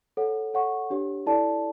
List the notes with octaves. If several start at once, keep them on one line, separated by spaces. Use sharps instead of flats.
A4 C#5 F#5
A4 C#5 F#5 C#6
D4 G4 C#5
E4 A4 D5 A5